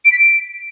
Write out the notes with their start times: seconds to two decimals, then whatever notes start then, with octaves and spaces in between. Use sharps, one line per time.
0.05 D7
0.12 B6
0.19 D7